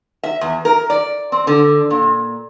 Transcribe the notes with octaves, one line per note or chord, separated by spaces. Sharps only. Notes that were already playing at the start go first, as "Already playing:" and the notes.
E5
E2
A#4
D5
C4
D3
A#2